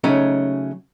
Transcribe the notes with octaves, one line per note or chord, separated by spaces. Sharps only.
C#3 F#3 A3 C#4 D#4